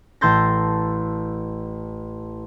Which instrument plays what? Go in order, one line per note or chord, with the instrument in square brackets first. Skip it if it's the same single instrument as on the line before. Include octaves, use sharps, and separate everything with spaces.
[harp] A1 A4 C6 G6 A6 A#6